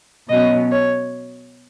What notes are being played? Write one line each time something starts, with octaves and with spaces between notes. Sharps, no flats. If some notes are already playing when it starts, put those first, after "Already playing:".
B2 F#3 C#4 D#5
C#5